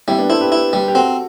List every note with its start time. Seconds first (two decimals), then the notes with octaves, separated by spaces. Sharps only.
0.08 G3 C4 E4
0.19 B3 D4
0.30 E4 A4 C5
0.41 G4 B4
0.52 E4
0.73 G3
0.88 G4
0.95 C4 F#4 A4